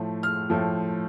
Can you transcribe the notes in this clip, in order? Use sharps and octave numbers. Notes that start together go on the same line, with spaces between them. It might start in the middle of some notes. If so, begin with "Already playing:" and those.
Already playing: A2 F3 A3
F6
A2 F3 A3